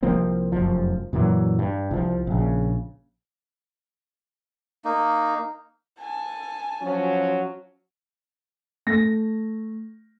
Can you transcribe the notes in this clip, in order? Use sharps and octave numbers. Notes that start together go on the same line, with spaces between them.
C2 F3 A#3 C4
F1 F#2 F3
F#2 A#2 E3 F#3
G2
C2 F3
A#1 C#3
A#3 D#4
G#5 A5
F3 F#3 C#4
A3 A#6